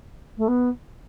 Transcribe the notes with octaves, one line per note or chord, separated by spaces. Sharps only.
A3
B3